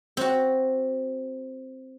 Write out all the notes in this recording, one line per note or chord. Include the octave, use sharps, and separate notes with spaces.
C4 F#4